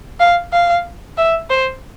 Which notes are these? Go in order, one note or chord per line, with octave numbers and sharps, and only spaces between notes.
F5
F5
E5
C5